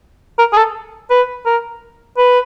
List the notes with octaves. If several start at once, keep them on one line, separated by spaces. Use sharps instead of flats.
A#4
G#4
A4
B4
A#4
B4